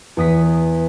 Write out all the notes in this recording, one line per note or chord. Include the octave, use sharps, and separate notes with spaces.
E2 D#6 B6